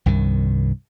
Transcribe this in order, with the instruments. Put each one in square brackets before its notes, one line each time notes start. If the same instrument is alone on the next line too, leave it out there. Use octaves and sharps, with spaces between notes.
[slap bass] C2 G2 C3 D#3